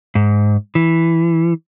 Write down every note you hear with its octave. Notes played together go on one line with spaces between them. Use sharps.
G#2
E3